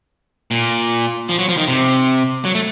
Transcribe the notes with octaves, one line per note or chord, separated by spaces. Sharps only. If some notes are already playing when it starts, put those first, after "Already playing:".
A#2
F3
F#3
F3
D#3
C3
F#3
A3